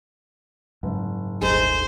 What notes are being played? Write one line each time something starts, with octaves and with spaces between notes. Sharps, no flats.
F#1 G#2
D#1 G#1 A3 D#4 G#4 C5